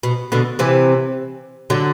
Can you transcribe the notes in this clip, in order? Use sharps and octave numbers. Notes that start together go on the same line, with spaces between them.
B2
B2 D3
C3 E3
D3 F#3